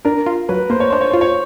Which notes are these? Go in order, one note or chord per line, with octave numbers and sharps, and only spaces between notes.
D4 A#4
F4
F#3 B4
A#3 C5
C#5
D4 C5
C#5
F4 C5
C#5